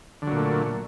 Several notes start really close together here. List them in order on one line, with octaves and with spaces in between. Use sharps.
D3 F#3 A#2 A3